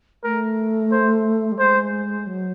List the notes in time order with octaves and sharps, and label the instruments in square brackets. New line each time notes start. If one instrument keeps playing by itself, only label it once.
[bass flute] A3 [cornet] A#4
[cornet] C5
[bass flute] G3
[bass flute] G#3 [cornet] C5
[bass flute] F#3